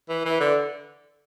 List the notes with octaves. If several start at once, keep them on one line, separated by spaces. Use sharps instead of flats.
E3
E3
D3